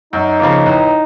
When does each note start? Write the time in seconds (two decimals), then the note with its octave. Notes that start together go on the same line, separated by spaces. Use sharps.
0.13 F#2 D#4
0.39 C#3 F3 A#3
0.65 A1